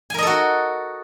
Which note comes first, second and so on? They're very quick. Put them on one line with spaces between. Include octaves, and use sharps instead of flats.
G#5 A#4 D#5 A4 F#4